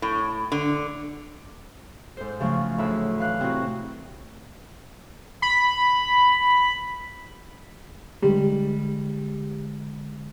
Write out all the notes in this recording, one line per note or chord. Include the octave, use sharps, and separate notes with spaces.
A2
D3
G#2 A4 C5
C#3 F3 F#3 A3
D2 A2 E5 B5 E6 F#6
E3 F5 F#6
C3 C4 D#4 E4 F#4
B5
D3 G3 G#3